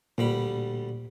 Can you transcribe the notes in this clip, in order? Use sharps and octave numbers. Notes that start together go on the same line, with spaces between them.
D2 A#2 G3 B5